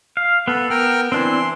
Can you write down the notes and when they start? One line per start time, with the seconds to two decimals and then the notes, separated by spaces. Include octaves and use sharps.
0.17 F5
0.48 B3 A4
0.70 B3 A#4 G5 F6
1.12 E3 C4 D4 E4 C6